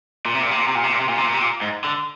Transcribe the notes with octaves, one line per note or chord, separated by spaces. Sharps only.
A#2
C3
A#2
C3
A#2
C3
A#2
C3
A#2
C3
A#2
C3
A#2
C3
A#2
G#2
D3